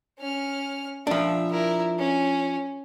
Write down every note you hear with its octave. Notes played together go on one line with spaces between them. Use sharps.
C#4 F6
F3 D4 E5
E4 A#4
C#4